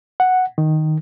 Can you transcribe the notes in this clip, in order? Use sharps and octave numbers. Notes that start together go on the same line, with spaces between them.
F#5
D#3